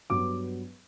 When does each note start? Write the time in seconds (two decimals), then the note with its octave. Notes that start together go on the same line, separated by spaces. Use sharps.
0.10 G2 F#3 B3 D6